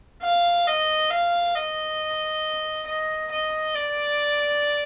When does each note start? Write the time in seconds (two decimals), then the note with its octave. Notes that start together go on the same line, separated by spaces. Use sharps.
0.23 F5
0.67 D#5
1.11 F5
1.55 D#5
2.87 D#5
3.32 D#5
3.75 D5